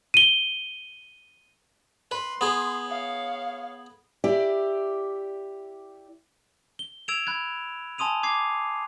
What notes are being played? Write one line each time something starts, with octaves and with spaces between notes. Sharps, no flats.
D#7 G7
B4 C6
B3 G#4
C#5 F5
E4 G4 D5
G7
E6 G#6 D7 E7 F7
B5 F#6 G#6
G#5 A5 C6 D#6 D#7 F7
D6 G#6 C7